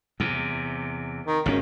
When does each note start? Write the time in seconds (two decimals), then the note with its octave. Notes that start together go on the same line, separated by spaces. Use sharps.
0.20 E2 C3
1.26 D#3
1.46 G#1 F#2 A#2 C#4